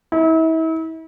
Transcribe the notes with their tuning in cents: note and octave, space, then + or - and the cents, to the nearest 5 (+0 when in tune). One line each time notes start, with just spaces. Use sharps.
E4 -40